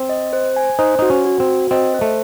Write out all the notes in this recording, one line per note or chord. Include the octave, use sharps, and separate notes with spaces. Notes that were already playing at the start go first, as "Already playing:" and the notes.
Already playing: C4
D#5
C5
G#5
D#4 C5
D#4 F#4
C#4
F#4
C4
F#4
C4 D#5
C5
A3